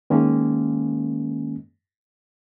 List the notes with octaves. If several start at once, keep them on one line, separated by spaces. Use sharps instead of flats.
D#3 G#3 A#3 C#4